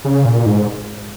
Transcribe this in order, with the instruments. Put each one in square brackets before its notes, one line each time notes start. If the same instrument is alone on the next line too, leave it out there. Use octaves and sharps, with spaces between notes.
[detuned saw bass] C#3
A#2
G#2